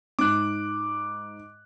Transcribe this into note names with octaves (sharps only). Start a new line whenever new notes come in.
G#2 D6 F#6